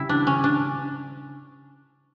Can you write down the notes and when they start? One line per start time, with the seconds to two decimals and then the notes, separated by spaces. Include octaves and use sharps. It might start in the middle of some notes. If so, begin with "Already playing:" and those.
Already playing: C#3 G3 E4
0.09 D4
0.27 C#4
0.44 D4